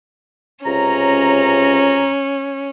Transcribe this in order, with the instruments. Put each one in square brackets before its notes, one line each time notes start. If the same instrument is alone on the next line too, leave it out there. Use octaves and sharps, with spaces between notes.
[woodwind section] C#2 C3 A#5 [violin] C#4